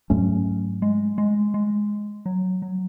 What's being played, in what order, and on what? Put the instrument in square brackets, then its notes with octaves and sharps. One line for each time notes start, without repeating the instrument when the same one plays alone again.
[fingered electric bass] G#2 F#3 A3 C#4
[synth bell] G#3
G#3
G#3
F#3
F#3